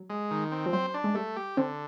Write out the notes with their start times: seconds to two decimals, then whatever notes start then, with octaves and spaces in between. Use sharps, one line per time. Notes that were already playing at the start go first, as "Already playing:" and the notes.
Already playing: F#3
0.10 G#3
0.31 D#3
0.52 C4
0.66 F3
0.73 F#3 C5
0.94 D4
1.04 G#3
1.15 G3 A3
1.36 G4
1.57 D3 C4